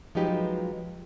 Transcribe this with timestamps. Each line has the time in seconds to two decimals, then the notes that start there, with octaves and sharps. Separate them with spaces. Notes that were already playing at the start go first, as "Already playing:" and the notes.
0.15 F3 F#3 G#3 D#4 G4 B4